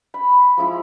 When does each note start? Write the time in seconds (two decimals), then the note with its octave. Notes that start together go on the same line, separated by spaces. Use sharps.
0.14 B5
0.57 F3 G#3 E4 F4